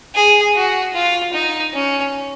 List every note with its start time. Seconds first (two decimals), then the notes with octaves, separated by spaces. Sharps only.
0.15 G#4
0.55 F#4
0.94 F4
1.34 D#4
1.74 C#4